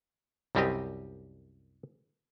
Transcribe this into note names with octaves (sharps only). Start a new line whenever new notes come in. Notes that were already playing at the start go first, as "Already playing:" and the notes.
C2 F#2 G3 C4 G4 D#5